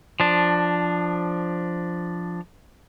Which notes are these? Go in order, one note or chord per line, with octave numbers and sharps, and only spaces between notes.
F3 D4